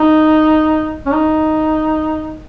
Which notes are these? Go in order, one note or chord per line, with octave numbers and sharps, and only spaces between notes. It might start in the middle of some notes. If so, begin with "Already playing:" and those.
Already playing: D#4
C#4
D#4